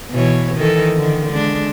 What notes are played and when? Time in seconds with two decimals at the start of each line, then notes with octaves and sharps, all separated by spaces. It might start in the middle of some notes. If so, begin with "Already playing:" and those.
0.11 B2 E3 C#5
0.55 D#3 E3 A4
0.97 D3 D#3
1.33 G#3 D4